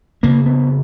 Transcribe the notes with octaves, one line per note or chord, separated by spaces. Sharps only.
F2 C#3 A#3
B3